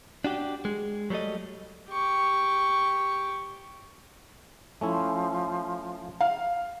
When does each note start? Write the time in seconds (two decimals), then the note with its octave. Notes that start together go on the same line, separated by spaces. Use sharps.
0.25 D4 F#4 G4
0.65 G#3
1.10 F#3 G3 A3 A4 D#5
1.89 G4 C#6
4.81 F3 A3 C#4 E4
6.21 F5